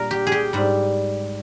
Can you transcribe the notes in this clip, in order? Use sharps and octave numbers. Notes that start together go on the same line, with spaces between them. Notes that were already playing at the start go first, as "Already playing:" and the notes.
Already playing: A#2 G3 A#4
G4
G#4
G4
G#2 G3